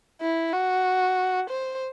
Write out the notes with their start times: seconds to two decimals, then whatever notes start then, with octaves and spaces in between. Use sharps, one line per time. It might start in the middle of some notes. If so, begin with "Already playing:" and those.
0.21 E4
0.53 F#4
1.50 C5